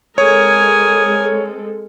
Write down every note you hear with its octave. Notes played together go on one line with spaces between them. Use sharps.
G#3 C4 A4 A#4 C#5 G#5 D#6